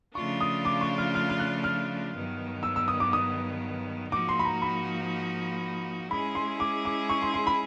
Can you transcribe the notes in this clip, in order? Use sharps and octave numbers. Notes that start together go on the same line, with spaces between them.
C#3 F3 A3 D4 F4 C#6
D#6
D6
C#6
F6
F6
F6
F#6
F6
G2 D#3 F#3 B3
E6
E6
D#6
D6
D#6
G#2 F3 A#3 D#4 F#4 D6
C6
B5
A#5
B5
G#3 C#4 E4 G#4 B5
C6
D6
D6
C#6
C6
C6
B5